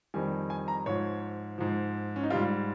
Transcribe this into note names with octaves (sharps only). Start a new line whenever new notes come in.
F2 D#3 G3 G#5
G#5
A#5
G#2 F3 C#5
G#2 F3
C#4
D#4
G#2 G3 F4